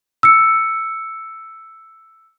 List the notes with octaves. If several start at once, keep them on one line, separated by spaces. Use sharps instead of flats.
E6 C#7